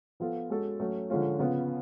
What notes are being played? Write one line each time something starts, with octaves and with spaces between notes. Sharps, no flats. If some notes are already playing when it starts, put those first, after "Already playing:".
F3 B3 F4 A4
G#3 C#4 F#4 A4
F#3 A3 C#4
D3 F3 G#3 C#4 F4
C#3 F3 B3 F4